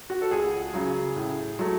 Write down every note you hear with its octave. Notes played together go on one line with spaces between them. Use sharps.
F#4
A4
C#2 G#4
C#3 F#3
A2
F#3 A3